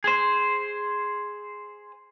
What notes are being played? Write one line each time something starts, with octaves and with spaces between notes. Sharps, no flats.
G#4 C5